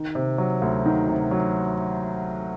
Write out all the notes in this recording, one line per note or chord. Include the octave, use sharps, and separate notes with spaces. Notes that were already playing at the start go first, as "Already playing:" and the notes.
Already playing: D#3
C3
F#3
D2
D#3
C3
F#3